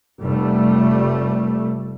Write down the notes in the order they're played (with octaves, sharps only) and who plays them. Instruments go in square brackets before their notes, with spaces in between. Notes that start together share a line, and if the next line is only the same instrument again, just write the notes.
[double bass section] F1 G3 A3